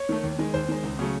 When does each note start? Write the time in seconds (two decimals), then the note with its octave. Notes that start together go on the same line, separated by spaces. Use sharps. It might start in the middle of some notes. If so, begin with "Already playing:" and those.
Already playing: C#5
0.09 D#3 A3
0.23 D#2
0.39 D#3 G#3
0.54 D#2 C5
0.68 D#3 G#3
0.83 C#2
0.99 C#3 F#3 A3